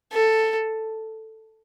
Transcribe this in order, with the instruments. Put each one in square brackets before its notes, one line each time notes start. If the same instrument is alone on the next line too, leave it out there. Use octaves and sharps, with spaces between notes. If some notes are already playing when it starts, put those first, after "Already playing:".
[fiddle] A4